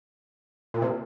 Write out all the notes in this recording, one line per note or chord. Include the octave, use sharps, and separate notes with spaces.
A#2
C3